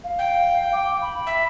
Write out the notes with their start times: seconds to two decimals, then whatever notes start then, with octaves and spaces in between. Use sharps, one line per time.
0.04 F5
0.19 G5
0.73 D6
1.02 B5
1.27 E5